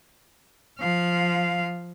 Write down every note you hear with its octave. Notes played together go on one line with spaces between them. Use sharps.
F3 F5